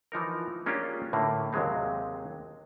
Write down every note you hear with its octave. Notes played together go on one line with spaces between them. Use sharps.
E3 F3 D#4 A#4
G#3 A#3 C#4 D4 F4 G4
A2 D3 A#3
D#2 C3 F#3 G#3 C4